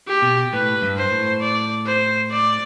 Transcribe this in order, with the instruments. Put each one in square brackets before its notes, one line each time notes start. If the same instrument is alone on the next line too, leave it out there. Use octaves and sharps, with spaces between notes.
[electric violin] G4
[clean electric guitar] B2
[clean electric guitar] A2 [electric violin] B4
[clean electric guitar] G2
[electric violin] C5
[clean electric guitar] A2
[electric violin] D5
C5
D5